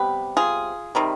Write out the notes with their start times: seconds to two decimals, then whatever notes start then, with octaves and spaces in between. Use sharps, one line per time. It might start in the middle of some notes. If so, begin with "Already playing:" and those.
Already playing: C3 G3 B3 G4 B4
0.37 F4 G#4
0.95 C3 D#3 G3